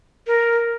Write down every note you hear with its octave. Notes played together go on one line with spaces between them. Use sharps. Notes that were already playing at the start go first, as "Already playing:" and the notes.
A#4